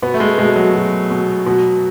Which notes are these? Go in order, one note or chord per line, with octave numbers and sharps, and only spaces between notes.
B2 B3
A3
G#3
B2 G#3
F#3
B2
B2
B2